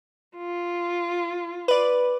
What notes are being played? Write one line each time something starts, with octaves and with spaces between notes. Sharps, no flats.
F4
B4 D5